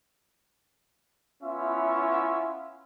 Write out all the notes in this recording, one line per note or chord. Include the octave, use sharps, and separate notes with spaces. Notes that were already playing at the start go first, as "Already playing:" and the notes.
B3 C#4 E4 F4 E5